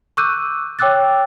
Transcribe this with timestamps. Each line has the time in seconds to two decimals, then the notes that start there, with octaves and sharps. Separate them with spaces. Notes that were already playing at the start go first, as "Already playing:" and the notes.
0.17 C#6 D6 E6 F#6 G6 D#7
0.79 C#5 G5 D6 E6 F#6 A6